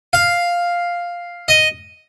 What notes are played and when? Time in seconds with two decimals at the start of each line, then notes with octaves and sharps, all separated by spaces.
0.13 F5
1.48 D#5